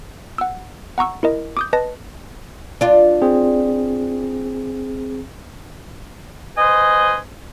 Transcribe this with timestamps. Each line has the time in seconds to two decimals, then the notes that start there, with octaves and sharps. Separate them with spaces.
0.38 F#5 E6
0.98 F#5 A#5 C#6 E6
1.23 E4 A#4 D#5
1.57 D6 D#6 G6
1.73 B4 D#5 A5 A#6
2.81 D4 F4
3.22 C4 G#4
6.57 B4 C5 D#5 G#5